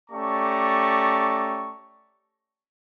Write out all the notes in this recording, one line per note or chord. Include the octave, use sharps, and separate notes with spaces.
A3 C#4 G4 D5 A#5 C#6